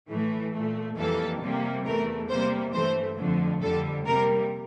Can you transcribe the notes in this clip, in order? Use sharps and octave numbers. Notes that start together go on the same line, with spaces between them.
A2 E3 A3
A#2 A3
F2 E3 G3 A#3 A4
C3 G3 A#3
E2 E3 A3 A#4
C3 G3 A#3 C5
G2 E3 A3 C5
F2 D3 F3 A3
F2 D3 G3 A4
C3 G3 A#3 A#4